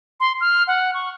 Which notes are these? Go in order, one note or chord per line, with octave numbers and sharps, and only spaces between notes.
C6
F6
F#5
C#6